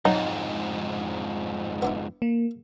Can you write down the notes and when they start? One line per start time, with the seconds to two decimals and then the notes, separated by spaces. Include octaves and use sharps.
0.05 F2 G#2 F#3 D#4
1.82 B3 D4 E4
2.22 A#3